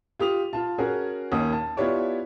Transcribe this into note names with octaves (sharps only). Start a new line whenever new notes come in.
F4 G4 D#6 F7
F4 A5
C#4 F#4 G#4 A#4
D#2 A#3 C#4 D#6
A5
B3 E4 F4 G4 C#5 D5